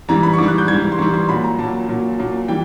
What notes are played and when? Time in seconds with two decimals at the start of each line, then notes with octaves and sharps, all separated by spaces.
0.09 G#2 E3 G3 A#5
0.23 B5
0.33 C#6
0.38 G#2 E3 G3 D6
0.48 F#6
0.58 G6
0.68 G#2 E3 G3 G#6
0.92 C6
0.99 G#2 E3 G3 C#6
1.14 C6
1.29 A#2 F#3 B5
1.44 A#5
1.58 A#2 F#3 A5
1.89 A#2 F#3
2.18 A#2 F#3
2.48 E3 G3 G5